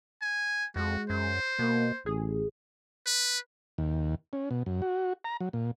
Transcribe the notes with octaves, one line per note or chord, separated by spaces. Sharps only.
G#5
F2 G#3 F#4
F#2 C5
B2 A#3
A1 G#4
B4
D#2
C#4
B2
F#2
F#4
A#5
F#3
A#2